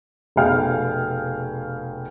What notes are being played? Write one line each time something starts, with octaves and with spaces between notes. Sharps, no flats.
F1 B2 G#4 F5 G5 F6